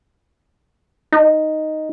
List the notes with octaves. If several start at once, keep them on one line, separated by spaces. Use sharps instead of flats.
D#4